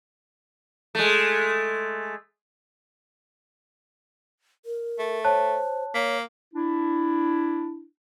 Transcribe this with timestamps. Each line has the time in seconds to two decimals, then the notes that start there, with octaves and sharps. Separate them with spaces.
0.95 G#3 A3
4.65 A#4
4.99 A3
5.25 C5 C#5 A5 F#6
5.94 A#3 C#5 B6
6.54 D4 E4